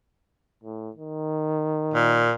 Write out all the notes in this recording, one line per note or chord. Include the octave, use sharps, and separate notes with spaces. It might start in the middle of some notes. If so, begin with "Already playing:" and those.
A2
D#3
A#2